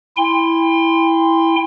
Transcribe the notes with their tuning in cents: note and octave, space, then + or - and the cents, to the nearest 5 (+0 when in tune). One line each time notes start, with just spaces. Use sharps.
E4 +0 G5 +35 C6 -5